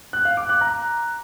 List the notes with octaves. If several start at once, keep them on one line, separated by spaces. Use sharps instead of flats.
F#6
F5
D6
F#6
A#5